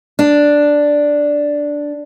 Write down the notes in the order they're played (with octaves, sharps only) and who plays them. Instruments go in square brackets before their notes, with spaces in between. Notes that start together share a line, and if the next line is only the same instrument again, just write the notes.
[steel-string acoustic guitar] D4